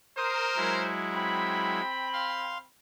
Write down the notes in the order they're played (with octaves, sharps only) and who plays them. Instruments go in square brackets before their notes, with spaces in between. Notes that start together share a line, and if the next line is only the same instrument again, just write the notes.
[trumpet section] A#4 C5 [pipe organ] D#6
[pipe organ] F#3 G#3 E4
[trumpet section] C4 G5 B5
[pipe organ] F5 C6